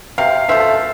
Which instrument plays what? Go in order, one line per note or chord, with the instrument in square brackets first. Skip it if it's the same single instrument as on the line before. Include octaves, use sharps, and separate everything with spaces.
[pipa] C3 [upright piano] F5
[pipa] F3 A3 [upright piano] E5